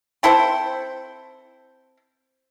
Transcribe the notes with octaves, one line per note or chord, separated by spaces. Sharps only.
C4 E4 A4 C5